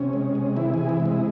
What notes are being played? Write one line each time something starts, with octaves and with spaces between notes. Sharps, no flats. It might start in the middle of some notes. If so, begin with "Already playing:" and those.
Already playing: C3 C#4
G#3
C3
E3 E4
C3 G#4
E4
G#3
E4